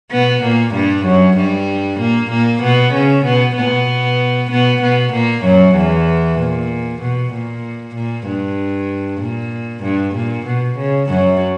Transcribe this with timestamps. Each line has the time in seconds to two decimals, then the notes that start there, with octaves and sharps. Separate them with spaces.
0.12 B2 B3
0.43 A#2 A#3
0.75 G2 G3
1.06 F#2 F#3
1.37 G2 G3
2.00 A#2 A#3
2.31 A#2 A#3
2.63 B2 B3
2.94 C#3 C#4
3.25 B2 B3
3.56 B2 B3
4.51 B2 B3
4.82 B2 B3
5.13 A#2 A#3
5.45 F#2 F#3
5.76 E2 E3
6.39 A#2
7.01 B2
7.33 A#2
7.95 A#2
8.27 G2
9.21 A#2
9.83 G2
10.15 A#2
10.46 B2
10.78 C#3
11.09 F#2 F#3